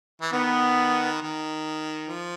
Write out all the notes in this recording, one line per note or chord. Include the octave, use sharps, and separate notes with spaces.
E3
D#3 B3
D#3
F3